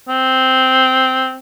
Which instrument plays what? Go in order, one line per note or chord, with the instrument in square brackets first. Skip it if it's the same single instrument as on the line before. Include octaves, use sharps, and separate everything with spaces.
[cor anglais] C4